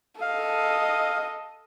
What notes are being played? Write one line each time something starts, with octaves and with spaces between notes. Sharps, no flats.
A4 D#5 F5